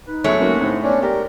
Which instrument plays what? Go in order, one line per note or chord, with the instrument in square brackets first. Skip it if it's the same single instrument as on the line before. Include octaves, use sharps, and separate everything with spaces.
[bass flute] D#4 [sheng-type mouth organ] B4
[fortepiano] E2 F#3 [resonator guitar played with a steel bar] G#3 A3 C#5
[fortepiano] F#2 A#3 D#4 [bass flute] F#3 [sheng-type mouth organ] F#5
[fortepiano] A2 D3 D#4 [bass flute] C4
[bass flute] B3 [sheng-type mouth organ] C#4 D4
[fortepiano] G4 D5 [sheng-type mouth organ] A#4